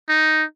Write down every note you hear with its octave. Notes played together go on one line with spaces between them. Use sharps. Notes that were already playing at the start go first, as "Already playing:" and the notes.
D#4